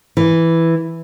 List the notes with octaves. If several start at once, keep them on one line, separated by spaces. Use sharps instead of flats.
E3